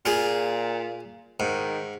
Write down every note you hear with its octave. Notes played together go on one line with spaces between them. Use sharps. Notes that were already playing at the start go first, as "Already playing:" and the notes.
A#2 F4 G#4
G#2 D#3